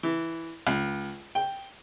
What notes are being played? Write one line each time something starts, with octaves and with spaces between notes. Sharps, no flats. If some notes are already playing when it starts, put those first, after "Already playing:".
E3
C#2
G5